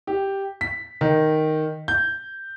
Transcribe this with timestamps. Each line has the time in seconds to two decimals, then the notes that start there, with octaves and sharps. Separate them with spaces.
0.07 G4
0.61 B6
1.01 D#3
1.88 G6